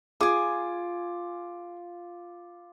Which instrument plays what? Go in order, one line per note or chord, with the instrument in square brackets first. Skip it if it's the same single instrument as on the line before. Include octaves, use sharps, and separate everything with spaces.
[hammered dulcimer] F4 [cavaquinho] G#4 G#5 [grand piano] D6